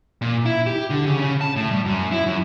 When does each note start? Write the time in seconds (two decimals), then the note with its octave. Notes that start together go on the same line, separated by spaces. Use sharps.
0.22 A#2
0.45 E4
0.66 G4
0.90 D3
1.06 C#3
1.20 C#3
1.41 A5
1.56 A2
1.71 G3
1.86 F#2
2.12 E4
2.26 F#2